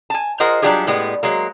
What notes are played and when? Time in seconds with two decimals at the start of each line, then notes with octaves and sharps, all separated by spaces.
0.10 G#5 A5
0.40 F4 G#4 A#4 C5 D#5 F#5
0.62 F#3 G3 D4 F4 G4 G#4
0.87 A2 G3 G#3 B3
1.23 F#3 G#3 A#3